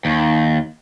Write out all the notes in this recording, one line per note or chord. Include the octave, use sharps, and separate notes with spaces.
D#2